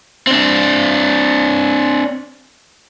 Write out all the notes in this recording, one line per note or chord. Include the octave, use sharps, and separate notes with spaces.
C4 D4